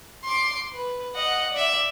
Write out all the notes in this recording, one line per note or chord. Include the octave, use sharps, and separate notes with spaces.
C6 D6
B4
D#5 F#5
D5 E5